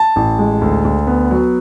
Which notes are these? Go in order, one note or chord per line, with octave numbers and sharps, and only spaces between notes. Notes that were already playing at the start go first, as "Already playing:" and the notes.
Already playing: A5
A1
G#3
D2
D2
B3
F#3